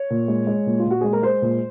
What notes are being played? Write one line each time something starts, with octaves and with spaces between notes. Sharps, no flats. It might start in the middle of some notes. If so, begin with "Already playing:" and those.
Already playing: C#5
A#2
G#3
G#3
A#2
F4
A#2
F#4
G#3 G#4
A#4
G#3 C5
A#2